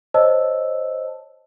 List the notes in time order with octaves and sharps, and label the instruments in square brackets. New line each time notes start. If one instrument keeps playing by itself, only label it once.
[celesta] C5 C#5 D#5 A5 E6